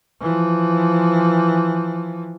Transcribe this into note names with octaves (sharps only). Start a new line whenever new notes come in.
E3 F3